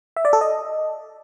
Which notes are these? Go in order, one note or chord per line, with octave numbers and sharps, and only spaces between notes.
E5
D5
A4
D#5